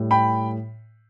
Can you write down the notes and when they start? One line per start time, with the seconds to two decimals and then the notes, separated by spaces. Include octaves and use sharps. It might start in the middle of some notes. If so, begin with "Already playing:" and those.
Already playing: A2 G3
0.11 G5 B5